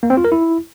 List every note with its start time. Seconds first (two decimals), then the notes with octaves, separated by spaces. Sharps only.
0.03 A#3
0.10 C4
0.17 F4
0.25 A#4
0.32 E4